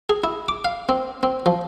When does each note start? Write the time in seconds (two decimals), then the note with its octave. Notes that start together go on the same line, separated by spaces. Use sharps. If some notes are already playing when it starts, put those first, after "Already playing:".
0.09 G#4
0.24 E4
0.48 D6
0.65 F5
0.89 C4
1.23 C4
1.46 F3